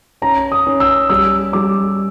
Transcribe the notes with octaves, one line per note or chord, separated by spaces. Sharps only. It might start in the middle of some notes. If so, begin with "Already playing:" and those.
C#4 A#5
D#6
C#4
E6
G3 E6
G3 D6